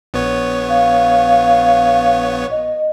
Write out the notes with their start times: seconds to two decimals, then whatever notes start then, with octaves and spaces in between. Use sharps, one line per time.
0.14 A#1 B3 C#5
0.69 F5
2.51 D#5